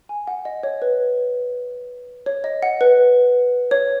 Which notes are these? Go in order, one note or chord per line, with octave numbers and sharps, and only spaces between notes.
G#5
F#5
D#5
C#5
B4
C#5
D#5
F#5
B4
C#5